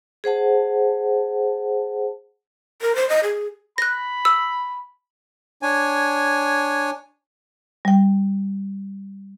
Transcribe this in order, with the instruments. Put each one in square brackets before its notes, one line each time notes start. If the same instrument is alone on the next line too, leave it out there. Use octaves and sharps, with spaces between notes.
[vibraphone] G#4 C5 F#5 A5
[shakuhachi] A#4
C5
D#5
G#4
[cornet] B5 [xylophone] F#6 A#6
[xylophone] E6
[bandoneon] D4 C#5 G#5
[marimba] G3 G5